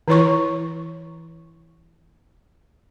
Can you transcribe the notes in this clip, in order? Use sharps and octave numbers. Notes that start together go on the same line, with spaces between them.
E3 E4 C#5 C#6